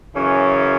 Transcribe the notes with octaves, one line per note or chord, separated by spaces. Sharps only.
F#2 C#3 E3 C#4